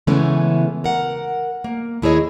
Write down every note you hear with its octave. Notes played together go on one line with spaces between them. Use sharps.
C#3 E3 G#3 A3 B3 C#4
A#4 F#5
A#3
D#2 E4 G#4 C#5 D#5